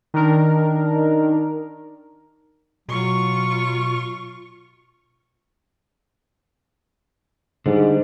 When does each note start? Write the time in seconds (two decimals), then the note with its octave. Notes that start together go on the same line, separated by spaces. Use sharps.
0.14 D#3 D4 A#4
2.89 B2 F#3 F4 C#6
7.66 G#2 D3 G3